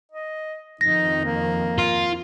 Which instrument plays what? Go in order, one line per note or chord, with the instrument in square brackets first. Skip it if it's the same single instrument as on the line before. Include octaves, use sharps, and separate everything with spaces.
[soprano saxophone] D#5
[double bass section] F2 D#3 [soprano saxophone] D#4 [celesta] A#6
[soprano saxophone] A#3
[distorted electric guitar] F4